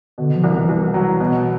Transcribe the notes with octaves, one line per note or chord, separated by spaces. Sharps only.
B2 D3
F3
C2
E3
C2
F#3
B2